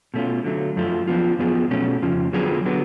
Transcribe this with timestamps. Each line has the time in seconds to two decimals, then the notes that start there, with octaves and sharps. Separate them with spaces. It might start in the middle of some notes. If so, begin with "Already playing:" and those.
0.14 B2 A3 C#4 F4
0.44 D3 F#3 A3
0.76 F#2 F3 A3 F4
1.08 F3 G#3 B3 D4 F4
1.39 F#2 F3 B3 F4 G#4
1.71 B2 A3 C#4
2.02 F2 C#3 F3
2.33 D3 F#3 B3 F4 G#4
2.66 D3 F#3 B3